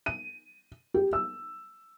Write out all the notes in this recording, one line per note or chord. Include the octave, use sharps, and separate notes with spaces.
D#7
G4
E6